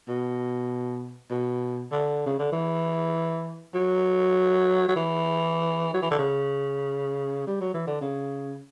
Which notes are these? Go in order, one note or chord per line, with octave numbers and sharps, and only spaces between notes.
B2
B2
D3
C#3
D3
E3
F#3
F#3
E3
F#3
E3
D3
C#3
G3
F#3
E3
D3
C#3